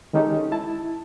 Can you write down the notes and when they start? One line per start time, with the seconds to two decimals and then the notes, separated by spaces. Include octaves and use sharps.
0.13 D#3 G#3 C#4 D#4 G4 A4
0.52 E4 A5